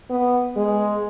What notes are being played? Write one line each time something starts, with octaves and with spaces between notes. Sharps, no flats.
B3
G#3